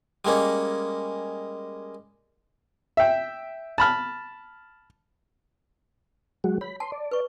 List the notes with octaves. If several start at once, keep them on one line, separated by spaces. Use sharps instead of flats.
G3 G#3 A#3 C#4
E5 G5
A5 B5 F6
F#3 G#3 F#4
C#5 B5
A5 C6
D5
B4 C#6